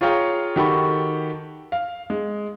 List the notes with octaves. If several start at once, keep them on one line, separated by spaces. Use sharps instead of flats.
F4 G#4 C#5 F5 G5 A#5
D#3 F#4 G4 A4 B5 C#6
F5
G#3